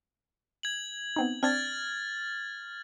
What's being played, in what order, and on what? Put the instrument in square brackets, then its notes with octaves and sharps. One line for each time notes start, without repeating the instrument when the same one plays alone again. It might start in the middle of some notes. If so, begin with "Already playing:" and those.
[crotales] G#6 F#7
[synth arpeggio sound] B3 C4 D#4
[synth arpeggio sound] C4 D4 D5 [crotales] F6 G#6 A6